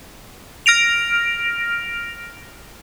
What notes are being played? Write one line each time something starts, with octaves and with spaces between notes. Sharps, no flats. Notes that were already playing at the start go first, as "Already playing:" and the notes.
F6 A#6 D7 F7